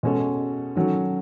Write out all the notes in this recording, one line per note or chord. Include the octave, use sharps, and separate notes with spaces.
B2 G#3 C#4 F#4 A4
D#3 F#3 C#4 F#4 A4